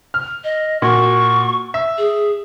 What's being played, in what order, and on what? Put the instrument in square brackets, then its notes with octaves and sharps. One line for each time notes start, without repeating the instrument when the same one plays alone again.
[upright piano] F6
[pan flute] D#5
[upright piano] A#2 F#4 [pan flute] C#6
[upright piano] E5
[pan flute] G#4